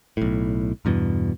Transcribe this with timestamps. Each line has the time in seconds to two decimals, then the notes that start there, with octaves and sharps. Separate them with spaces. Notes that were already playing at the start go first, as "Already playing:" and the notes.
0.17 B1 A2
0.85 E2 G2 B2 E3